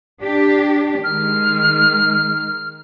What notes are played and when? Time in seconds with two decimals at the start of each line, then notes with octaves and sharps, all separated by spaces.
0.22 D4 G4
1.03 D#3 G#3 F6